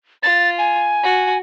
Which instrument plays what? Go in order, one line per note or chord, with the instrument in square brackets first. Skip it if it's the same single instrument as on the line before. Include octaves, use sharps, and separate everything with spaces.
[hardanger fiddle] F4 [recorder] A6
[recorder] G#5
[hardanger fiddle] F#4